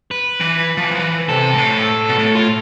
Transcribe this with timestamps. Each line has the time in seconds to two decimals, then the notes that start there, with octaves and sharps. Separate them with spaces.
0.11 B4
0.40 E3
0.77 F3
0.84 E3
0.91 F3
0.99 E3
1.29 C3 A4
1.54 G#2
1.58 A2
2.09 B2
2.18 A2
2.35 F4